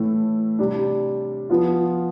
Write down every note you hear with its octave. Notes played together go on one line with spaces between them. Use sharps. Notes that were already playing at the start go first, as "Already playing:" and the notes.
Already playing: A2 E3 A3
C3 G3 D4
F3 B3 F4